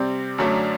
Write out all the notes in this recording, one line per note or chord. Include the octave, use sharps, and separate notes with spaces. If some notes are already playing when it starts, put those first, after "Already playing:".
Already playing: C3 G3 C4
F#2 D3 F#3 A3 D4